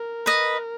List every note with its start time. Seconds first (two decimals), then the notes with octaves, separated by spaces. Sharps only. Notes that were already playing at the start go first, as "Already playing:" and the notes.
Already playing: A#4
0.26 B4 D#5